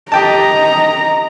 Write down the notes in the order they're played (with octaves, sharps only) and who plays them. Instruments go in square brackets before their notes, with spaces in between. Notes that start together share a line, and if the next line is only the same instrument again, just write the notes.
[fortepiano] G4 G5 A5 [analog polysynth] D#5 [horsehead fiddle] A#5